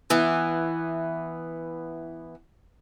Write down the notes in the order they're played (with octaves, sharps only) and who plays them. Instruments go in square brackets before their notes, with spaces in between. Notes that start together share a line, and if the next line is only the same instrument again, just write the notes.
[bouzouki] E3 B3